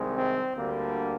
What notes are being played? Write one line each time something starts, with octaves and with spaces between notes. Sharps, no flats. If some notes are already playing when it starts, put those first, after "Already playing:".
Already playing: C2 C3 D#3 G#3
C4
D2 D3 G3 A#3